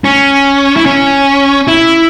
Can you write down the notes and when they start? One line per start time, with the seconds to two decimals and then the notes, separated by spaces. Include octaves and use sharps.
0.04 C#4
0.77 E4
0.86 C#4
1.68 E4